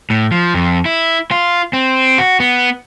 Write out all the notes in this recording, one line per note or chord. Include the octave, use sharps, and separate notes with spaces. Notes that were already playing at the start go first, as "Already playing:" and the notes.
A2
F3
F2
E4
F4
C4
F#4
B3